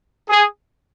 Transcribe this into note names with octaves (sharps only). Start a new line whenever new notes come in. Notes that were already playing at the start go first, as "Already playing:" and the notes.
G#4